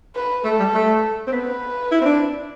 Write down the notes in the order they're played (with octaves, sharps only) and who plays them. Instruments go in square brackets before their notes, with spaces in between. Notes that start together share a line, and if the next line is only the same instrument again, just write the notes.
[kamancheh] B4
[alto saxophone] A3 [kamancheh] A4
[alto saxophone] G3
A3
C4
[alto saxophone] B3 [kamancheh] B4
[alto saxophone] E4
C4
D4